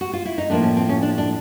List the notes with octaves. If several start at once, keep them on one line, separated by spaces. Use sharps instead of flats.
F#4
F4
E4
D#4
A2 F3 A#3 D4
C#4
C4
C#4
D4
D4